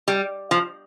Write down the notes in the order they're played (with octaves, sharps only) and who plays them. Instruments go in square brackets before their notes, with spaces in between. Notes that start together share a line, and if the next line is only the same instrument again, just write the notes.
[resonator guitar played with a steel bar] G3
F3